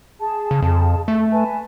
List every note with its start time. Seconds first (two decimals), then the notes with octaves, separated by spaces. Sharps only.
0.19 G#4 A5
0.51 C#3
0.62 F2
1.08 A3
1.31 B4 G#5 A5